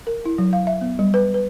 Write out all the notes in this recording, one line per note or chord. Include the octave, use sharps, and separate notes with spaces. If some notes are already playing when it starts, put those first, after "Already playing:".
A#4
E4
F#3
F5
E5
B3
G3
B4
B4